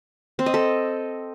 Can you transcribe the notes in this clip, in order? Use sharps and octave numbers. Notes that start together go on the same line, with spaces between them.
C4
D#5
A4